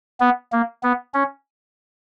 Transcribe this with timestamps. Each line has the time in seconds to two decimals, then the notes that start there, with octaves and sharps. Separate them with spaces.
0.20 B3
0.52 A#3
0.83 B3
1.14 C#4